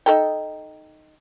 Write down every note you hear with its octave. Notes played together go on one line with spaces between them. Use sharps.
D#4 A4 G5